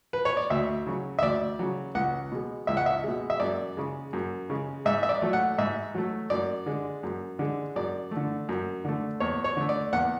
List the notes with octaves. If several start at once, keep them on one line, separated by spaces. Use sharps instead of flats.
B4
C#5
D5
D2 E5
C#3 F#3
E5
D2 D5
C#3 F#3
C#2 F#5
B2 G#3
C#2 E5
F#5
E5
B2 G#3
E5
F#2 D5
C#3 G#3
F#2
C#3 G#3
G#2 E5
E5
D5
F#3 A3
F#5
G#2 E5
F#3 A3
F#2 D5
D3 G#3
F#2
D3 G#3
F#2 D5
A3
D3
F#2
D3 A3
E2 C#5
C#5
D3 A3
D5
E2 F#5